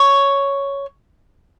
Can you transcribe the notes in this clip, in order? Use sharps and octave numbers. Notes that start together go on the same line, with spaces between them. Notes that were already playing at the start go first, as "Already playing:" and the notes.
Already playing: C#5